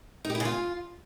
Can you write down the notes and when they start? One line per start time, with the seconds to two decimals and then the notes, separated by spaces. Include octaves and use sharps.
0.25 D#4
0.30 G4
0.35 E4
0.40 C#3
0.45 F4